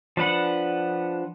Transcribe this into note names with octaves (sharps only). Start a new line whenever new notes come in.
F3 D4 B4 F#5